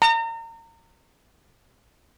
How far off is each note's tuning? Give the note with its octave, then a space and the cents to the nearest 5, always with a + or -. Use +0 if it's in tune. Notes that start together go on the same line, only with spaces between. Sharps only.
A#5 -30